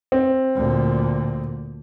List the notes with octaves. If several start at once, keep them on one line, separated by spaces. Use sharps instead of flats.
C4
D2 A#2